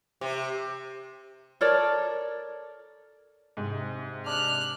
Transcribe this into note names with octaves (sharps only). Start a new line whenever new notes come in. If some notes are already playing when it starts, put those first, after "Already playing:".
C3
A4 A#4 C#5 D5
G#2 C3
D4 F6 F#6